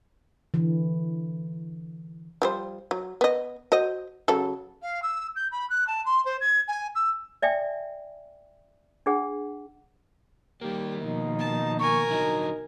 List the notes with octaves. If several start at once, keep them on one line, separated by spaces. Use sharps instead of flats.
D3 E3
F3 G3 C5
F#3
B3 D#5
F#4 C5 D#5
C#3 F#3 A4
F5
E6
G6
B5
F#6
A5
C6
C5
G#6
G#5
E6
D5 E5 G5 G#5
D4 G#4 F#5
D#3 G3 A#3 G4
B2 F3 D#4
A5
A#4 G#5 C#6
D3 F#3 D#4